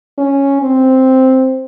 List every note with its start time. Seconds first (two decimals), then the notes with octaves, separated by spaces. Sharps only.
0.18 C#4
0.62 C4